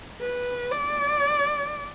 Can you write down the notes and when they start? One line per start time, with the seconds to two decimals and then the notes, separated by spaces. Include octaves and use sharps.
0.21 B4
0.72 D5